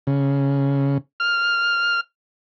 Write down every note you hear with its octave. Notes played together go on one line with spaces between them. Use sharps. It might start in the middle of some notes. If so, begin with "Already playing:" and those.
C#3
F6